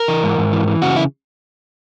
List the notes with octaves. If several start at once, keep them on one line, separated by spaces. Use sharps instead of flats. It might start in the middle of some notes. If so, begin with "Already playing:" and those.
Already playing: A#4
E3
G#2
G#2
E3
E3
C#3 F#4
E4